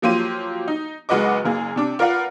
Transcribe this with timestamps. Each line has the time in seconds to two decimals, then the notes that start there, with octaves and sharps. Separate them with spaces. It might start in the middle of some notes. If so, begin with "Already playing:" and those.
0.02 F3 F#3 A#3 G4 C6 D#7
0.68 D#4
1.09 F#1 G#3 F#4 B4 D#5 D6
1.45 F#1 A#3 G#4
1.76 C3 D4 D6
1.99 F4 A#4 B4 D5 F5 F#5